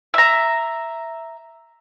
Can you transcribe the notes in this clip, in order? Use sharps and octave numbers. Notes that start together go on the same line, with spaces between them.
E5 A#5